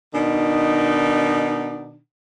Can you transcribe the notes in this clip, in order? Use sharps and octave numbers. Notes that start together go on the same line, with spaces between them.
B2 D#3 D4 D#4